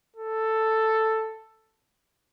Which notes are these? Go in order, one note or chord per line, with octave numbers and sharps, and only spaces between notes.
A4